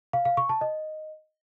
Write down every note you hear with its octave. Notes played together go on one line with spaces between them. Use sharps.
F5
F5
C#6
A5
D#5